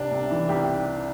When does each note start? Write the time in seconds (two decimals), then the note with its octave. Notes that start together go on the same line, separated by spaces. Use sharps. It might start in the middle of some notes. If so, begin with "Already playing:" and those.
Already playing: C2 C3 D4
0.11 C2
0.31 E3
0.49 C2 G4